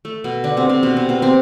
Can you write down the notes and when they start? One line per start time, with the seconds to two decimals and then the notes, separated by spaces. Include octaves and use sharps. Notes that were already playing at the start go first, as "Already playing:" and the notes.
0.05 A3
0.24 B2 B3
0.44 D3 D4
0.57 C3 C4
0.69 C3 C4
0.83 B2 B3
0.97 C3 C4
1.09 B2 B3
1.22 C3 C4